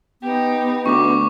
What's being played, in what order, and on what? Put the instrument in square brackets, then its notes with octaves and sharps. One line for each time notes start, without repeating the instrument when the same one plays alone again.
[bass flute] B3 [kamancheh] D#4 G4
[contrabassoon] D2 [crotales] C#6 D6